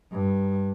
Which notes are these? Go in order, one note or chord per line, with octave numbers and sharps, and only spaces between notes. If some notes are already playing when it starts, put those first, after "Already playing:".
G2